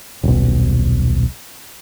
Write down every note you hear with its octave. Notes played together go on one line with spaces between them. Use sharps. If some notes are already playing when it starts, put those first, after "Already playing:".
D#1 B1